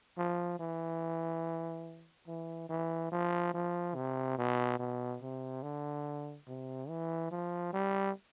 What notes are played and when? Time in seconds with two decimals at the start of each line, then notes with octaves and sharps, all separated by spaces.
0.18 F3
0.60 E3
2.27 E3
2.70 E3
3.12 F3
3.54 F3
3.95 C3
4.38 B2
4.79 B2
5.22 C3
5.63 D3
6.48 C3
6.89 E3
7.31 F3
7.73 G3